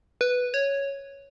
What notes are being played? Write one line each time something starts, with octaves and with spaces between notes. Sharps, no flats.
B4
C#5